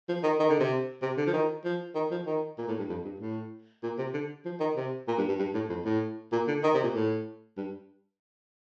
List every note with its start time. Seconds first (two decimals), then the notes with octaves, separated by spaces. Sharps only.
0.09 F3
0.23 D#3
0.40 D#3
0.50 D3
0.60 C3
1.02 C3
1.17 D3
1.27 F3
1.33 D#3
1.65 F3
1.95 D#3
2.11 F3
2.26 D#3
2.58 A#2
2.68 A2
2.79 G2
2.89 F2
3.05 G2
3.20 A2
3.83 A#2
3.98 C3
4.14 D3
4.45 F3
4.60 D#3
4.76 C3
5.08 A#2
5.18 G2
5.29 G2
5.39 G2
5.54 A2
5.69 F2
5.85 A2
6.32 A#2
6.48 D3
6.63 D#3
6.74 C3
6.84 A#2
6.95 A2
7.57 G2